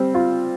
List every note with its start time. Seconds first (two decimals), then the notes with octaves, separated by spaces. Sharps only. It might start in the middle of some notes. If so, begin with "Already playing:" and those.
Already playing: G3 C4
0.14 F4